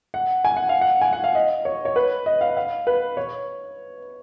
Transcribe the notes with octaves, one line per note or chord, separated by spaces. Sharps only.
F#5
G#5
F#5
F5
F#5
G#5
F#5
F5
D#5
C#5
C#5
B4
D#5
F5
F5
B4
C#5